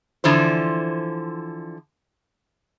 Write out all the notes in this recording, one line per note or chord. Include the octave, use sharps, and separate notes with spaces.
D3 E3 F3 C5